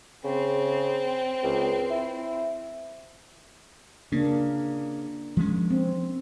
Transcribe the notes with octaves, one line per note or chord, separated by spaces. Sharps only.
C#3 C4
C#2
E4
C#3 A#3 D4
F3 G#3 C#4
C4